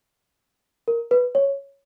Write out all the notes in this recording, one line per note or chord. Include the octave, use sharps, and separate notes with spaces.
A#4
B4
C#5